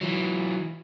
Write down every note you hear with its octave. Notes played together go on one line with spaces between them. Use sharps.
E3 F#3